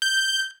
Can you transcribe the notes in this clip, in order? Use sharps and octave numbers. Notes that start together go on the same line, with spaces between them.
G6